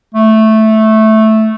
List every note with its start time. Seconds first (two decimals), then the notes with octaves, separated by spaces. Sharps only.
0.15 A3